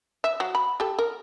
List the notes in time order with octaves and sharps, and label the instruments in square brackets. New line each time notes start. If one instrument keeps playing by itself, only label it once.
[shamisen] E5
F#3
B5
G4 A4
A#4